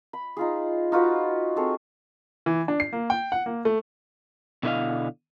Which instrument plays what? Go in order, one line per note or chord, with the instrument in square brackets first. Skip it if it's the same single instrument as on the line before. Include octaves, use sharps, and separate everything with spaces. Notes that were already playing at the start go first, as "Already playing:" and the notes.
[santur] B5
D#4 F4 G#4
D#4 F4 F#4 B4
C4 G#4 A4 C#5
[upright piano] E3
D4
C7
A#3
G5
F#5
A#3
A3
[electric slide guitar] B2 D3 E4 C#5 D#5 F5